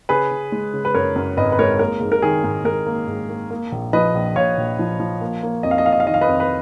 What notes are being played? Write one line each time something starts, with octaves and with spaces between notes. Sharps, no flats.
C#3 G#4 B4
C#3
G#3
C#3
B4
F#2 A#4 C#5
F#2
G#1 B4 D#5
B4
G#3 A#4 C#5
A#3 A#4
G#2
A#4
D#3 G#4
G#2
G#2 A#4
A#3
G#2
A#3
A#3
A#1
F3 B4 D#5
A#1
A#1 C#5 F5
A#1
F3
F3
A#3
A#3
F2 D#5
F5
D#5
A#3 F5
D#5
F5
D#3 D#5
F5
B4 D#5
F2
B4